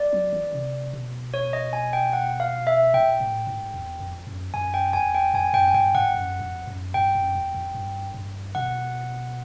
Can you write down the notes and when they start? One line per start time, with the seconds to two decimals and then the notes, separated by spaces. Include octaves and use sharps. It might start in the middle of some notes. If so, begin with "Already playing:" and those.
Already playing: D5
0.13 F#3
0.33 E3
0.53 C3
0.93 B2
1.34 C#5
1.53 D#5
1.73 G#5
1.93 G5
2.13 F#5
2.40 F5
2.67 E5
2.94 A#2 G5
3.20 A2
3.47 G#2
3.74 E2
4.00 F2
4.27 F#2
4.54 F#2 G#5
4.74 G5
4.93 E2 G#5
5.15 G5
5.34 F2 G#5
5.45 G#5
5.54 F#2 G5
5.68 G#5
5.74 G2 G5
5.95 G#2 F#5
6.14 F#2
6.41 F2
6.67 F#2
6.94 G2 G5
7.15 F#2
7.35 E2
7.55 F2
7.75 G2
8.14 G2
8.55 B2 F#5